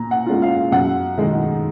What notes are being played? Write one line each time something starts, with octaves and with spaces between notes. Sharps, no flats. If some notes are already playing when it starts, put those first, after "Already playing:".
Already playing: A#2 A#5
F#5
G#3 C#4 F4
F5
F#2 F#5
D#3 G#3 D#4